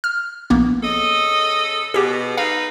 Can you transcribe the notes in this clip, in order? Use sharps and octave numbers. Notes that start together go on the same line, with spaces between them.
F6
A#1 A#3 B3
C#3 A4 D#5
B2 G4 G#4
D#4 A4 B4 F5